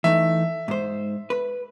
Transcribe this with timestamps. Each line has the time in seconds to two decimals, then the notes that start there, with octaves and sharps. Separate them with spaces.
0.04 E3 A3 D#4 E5
0.68 G#2 C5
1.30 B4